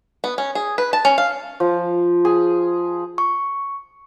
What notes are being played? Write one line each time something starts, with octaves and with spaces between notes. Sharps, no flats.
B3
C#4
G#4
B4
A5
C#4
F5
F3
G#4
C#6